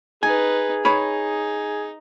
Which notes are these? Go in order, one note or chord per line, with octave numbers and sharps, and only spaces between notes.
D#4 G#4 B4 G#5
D#4 C#5 B5